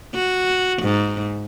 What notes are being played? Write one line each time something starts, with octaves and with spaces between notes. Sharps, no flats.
F#4
G#2